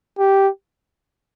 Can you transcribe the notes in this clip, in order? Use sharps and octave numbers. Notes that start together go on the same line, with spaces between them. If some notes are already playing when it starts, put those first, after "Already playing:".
G4